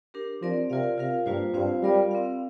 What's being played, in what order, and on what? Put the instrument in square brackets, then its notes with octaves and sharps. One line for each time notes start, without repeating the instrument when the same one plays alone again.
[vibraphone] D4 G4 A#4
[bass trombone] F3 [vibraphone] C4 A#4 D5
[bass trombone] C3 [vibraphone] F4 A#4 D5 F5
[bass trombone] C3 [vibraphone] F4 A#4 F5
[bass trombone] G2 [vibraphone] G3 A#3 F4 C5
[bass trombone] G2 [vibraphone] C4 F4 C5 F5
[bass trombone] G3 [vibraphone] F4 A#4 D5 F5
[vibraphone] C4 A#4 F5